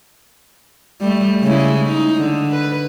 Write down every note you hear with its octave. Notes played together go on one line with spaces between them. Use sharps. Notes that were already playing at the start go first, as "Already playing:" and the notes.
G3 A3
C#3 G#3 E4
D#4
D3
B4